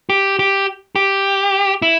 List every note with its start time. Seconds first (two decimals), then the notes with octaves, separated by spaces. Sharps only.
0.09 G4
0.39 G4
0.95 G4
1.82 E4